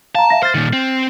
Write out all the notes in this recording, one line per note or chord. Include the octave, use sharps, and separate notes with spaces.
F5 A5 A#5
E5 F5 A#6
C5 F6 A6
A#2 D#3
C4